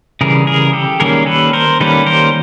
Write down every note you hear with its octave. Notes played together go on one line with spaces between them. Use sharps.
C#3 E3 G3 G#4 A#4
G#4 A#4
G4 A4
D#3 G3 A#3 C#4 G#4 A#4
A4 B4
A#4 C5
D#3 G3 A#3 C#4 A4 B4
A#4 C5